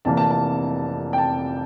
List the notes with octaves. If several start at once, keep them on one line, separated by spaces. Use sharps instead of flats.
F1 F2 C3 E3 A#3 A5
A5
A5
G5
A5